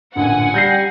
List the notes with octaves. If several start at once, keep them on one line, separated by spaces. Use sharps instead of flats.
A1 A#2 D3 F#5 G#5
G3 G6 A#6 C7